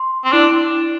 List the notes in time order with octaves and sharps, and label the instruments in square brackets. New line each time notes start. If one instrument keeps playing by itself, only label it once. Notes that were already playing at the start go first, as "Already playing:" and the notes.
Already playing: [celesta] C6
[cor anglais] C4
[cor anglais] D4 [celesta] E4